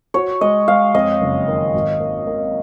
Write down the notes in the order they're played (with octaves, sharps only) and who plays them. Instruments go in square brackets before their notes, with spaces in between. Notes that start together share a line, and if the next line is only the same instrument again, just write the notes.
[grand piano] F#4 [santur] C#5
[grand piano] G#3 [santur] D#5
[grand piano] G#3 [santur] F5
[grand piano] F2 [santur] D#5
[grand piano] F#1
D#3
G#1
A#3
A#3